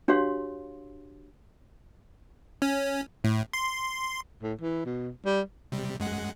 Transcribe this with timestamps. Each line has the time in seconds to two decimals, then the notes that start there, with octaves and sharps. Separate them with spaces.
0.08 D4 F#4 G4 C#5 F5 C6
2.62 C#4
3.24 A2
3.53 C6
4.42 A2
4.61 E3
4.86 B2
5.25 G3
5.72 C3 G3
6.00 F#2 G#3 F#5